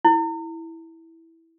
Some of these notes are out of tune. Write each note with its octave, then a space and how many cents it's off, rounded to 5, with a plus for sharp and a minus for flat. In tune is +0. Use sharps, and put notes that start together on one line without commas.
E4 -5